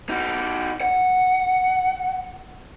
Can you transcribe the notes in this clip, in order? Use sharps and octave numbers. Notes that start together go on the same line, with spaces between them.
D#4 F#4
F#5